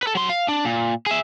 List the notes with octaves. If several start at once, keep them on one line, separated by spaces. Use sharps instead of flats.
A4 B4
F#3 C6
F5
D4
A#2
G#4 E5